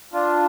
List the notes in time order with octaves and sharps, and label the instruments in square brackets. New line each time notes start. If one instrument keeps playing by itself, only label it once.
[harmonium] D4 F4